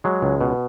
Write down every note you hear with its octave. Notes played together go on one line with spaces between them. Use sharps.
F#3 G#3
C#2
B2